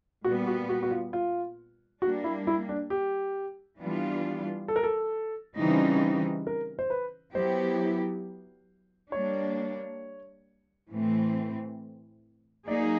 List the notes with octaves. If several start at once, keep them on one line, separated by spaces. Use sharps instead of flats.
A#2 G3 B3 F#4
F#4
F#4
F#4
F4
F4
G3 A#3 D4 F#4
E4
E4
D4
G4
E3 G3 B3 D4 F4
A4
A#4
A4
C#3 E3 G3 C4 D#4
A#4
C5
B4
F#3 B3 E4 G4 C5
G3 A#3 D4 C#5
A2 E3 A3 C4
F#3 A#3 D#4 G#4 D5